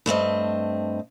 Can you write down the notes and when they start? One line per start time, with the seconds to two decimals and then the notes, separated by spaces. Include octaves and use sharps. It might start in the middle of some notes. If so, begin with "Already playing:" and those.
0.06 G2 A3 C4 D#5